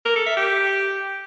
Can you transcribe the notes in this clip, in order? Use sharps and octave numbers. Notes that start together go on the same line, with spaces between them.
A#4
A4
E5
G4